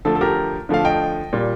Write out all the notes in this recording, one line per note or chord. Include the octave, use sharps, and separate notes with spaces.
D3 F3 A3 A4
A4
G4 A#4
D3 F3 A3 F5
D#5 G5
A#2 G3